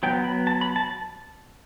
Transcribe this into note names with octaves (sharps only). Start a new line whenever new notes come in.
F#3 B3 G5
B5
A5
B5
A5